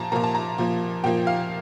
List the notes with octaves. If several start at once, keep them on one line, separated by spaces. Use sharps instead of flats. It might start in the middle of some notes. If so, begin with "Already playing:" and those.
Already playing: A#2 F3 A#3 A5 A#5
A#2 F3 A#3 A#5
A5
A#5
A#2 F3 A#3
A#2 F3 A#3 G5
F5